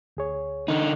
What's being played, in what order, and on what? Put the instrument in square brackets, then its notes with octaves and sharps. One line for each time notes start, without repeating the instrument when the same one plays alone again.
[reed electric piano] D2 G#4 C#5
[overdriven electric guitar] D3 D#4